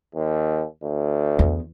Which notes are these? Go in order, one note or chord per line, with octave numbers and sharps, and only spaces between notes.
D#2
D2
E2